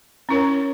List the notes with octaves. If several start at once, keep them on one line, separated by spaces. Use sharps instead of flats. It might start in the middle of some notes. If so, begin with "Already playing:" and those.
C#4 E4 A#4 C#5